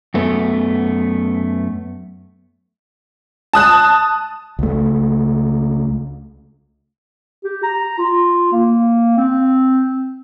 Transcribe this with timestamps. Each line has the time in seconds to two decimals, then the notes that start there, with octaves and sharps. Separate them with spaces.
0.14 F#2 A3 B3
3.53 A5 D#6 F#6
4.59 C#2 A3
7.45 G4
7.63 A#5
7.98 F4
8.53 A#3
9.17 C4